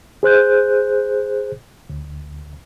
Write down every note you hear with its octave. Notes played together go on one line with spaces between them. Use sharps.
G#4 C5 F#6 G6
D2